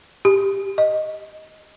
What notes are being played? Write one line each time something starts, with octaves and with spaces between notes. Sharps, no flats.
G4
D#5